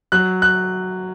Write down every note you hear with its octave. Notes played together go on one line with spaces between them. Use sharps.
F#3 F#6
F#6